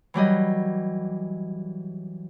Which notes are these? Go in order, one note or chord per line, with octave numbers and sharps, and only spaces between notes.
E3 F#3 G3 D#5